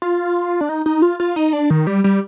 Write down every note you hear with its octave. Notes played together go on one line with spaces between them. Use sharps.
F4
D4
D#4
D#4
F4
F4
D#4
D4
D#3
G3
G3